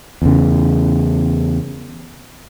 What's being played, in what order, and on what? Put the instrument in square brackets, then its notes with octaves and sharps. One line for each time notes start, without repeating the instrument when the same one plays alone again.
[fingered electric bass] E2 C#3